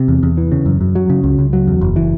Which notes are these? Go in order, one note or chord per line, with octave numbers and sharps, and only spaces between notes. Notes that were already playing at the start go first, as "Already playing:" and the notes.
Already playing: C3
E2
E2
E3
C#3
F#2
F#2
F#3
C#3
C#2
C#2
F#3
E2
F#1
E3